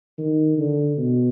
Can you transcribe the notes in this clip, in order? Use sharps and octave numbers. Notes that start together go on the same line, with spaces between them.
D#3
D3
B2